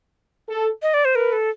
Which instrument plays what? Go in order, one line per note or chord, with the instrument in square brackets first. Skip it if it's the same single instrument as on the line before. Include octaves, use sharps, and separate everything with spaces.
[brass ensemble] A4
[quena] D#5
D5
C5
[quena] A#4 [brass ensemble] B4
[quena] A4